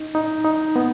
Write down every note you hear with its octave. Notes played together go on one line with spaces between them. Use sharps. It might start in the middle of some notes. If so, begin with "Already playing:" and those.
Already playing: D#4
D#4
D#4
B3